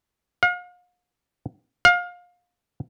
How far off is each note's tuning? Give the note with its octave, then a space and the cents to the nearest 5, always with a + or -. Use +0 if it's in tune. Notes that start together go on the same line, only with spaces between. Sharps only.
F5 +40
F5 +25